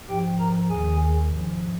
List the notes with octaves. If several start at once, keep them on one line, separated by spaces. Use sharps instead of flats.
G#2 F3 G4 G5
A#4 A#5
D#2 D#3 G#4 G#5
G#2 F3